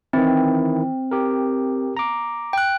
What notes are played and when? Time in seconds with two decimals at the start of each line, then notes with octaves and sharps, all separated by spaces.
0.13 D#3 E3 C4 E4
1.11 G4 A#4
1.97 A#5 D6
2.53 G5 F#6